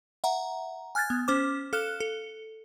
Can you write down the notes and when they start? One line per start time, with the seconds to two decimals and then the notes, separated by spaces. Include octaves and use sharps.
0.24 E5 F#5 A#5
0.95 G#5 F6 F#6 G#6 A6
1.10 B3
1.28 C#4 C5 D6
1.73 A4 F5 F6 F#6 E7
2.00 A4